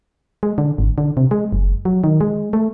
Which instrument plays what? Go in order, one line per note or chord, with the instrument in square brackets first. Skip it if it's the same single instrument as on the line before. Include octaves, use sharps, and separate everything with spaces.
[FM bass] G#3
D3
G#1
D3
C3
G#3
F#1
F#3
D#3
G#3
A3